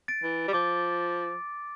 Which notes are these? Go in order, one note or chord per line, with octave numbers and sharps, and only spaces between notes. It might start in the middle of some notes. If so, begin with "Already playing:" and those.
A6 D7
E3
G3
F3 D6